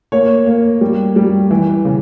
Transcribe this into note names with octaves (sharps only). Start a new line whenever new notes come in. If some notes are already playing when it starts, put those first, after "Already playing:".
A#3 C#5
A#3
G3
G3
E3
C#3